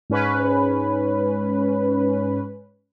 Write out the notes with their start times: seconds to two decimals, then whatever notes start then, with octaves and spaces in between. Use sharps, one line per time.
0.10 G#2 C#4 B4